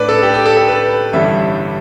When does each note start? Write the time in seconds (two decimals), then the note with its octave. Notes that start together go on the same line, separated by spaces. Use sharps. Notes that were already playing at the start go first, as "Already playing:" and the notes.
Already playing: A2 A3 D4 B4 D5
0.09 A4
0.23 G4
0.34 G4
0.45 A4
0.57 A4
0.68 B4
1.13 A1 G2 D3 G3 E4 E5